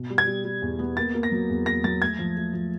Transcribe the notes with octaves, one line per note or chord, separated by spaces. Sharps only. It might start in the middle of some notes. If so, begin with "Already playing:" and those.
Already playing: B2
G3
G#6
G3
G3
E2
B3
A#3 A6
A#3
A#6
F#3
E2
A#3 A#6
F#3 A6
A3 G#6
F3
A3
F3